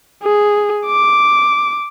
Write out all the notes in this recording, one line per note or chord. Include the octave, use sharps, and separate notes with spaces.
G#4
D6